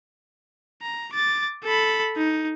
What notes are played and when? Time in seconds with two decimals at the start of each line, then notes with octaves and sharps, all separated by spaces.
0.82 A#5
1.13 D6 A6
1.64 A4 B5
2.17 D#4